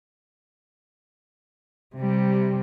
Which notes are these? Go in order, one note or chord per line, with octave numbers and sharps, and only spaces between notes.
C3 G3